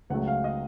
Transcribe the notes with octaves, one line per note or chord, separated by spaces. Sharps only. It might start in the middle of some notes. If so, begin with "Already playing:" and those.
C#2 C#3 F#3 A3 F#5
F5
D#5